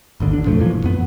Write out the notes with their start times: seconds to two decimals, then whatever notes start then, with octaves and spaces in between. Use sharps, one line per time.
0.20 G#1 D#2 D3
0.33 A1 D4
0.45 E2 B2 F3 A3
0.58 G2 A#2 E3 F3
0.71 E1
0.84 F#2 B3